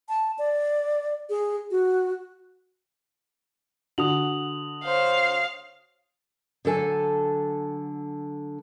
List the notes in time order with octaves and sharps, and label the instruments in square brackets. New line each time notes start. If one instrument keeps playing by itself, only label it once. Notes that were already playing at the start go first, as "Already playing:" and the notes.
[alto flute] A5
D5
G#4
F#4
[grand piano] D3 F#4 [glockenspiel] D#6 F7 F#7
[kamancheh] C5 C#5 [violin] F5
[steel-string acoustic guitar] D3 F#3 A4 G#5